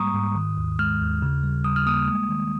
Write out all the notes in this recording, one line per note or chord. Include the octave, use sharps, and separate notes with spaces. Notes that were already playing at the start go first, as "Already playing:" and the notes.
Already playing: G#2 G3 G#3 A#3 A#5 C#6 D#6
G#2
D#3
D#2
G#3 F6
D#2
C#3
G3
G3 D#6
F6
A#3 D#6
G#3
D#3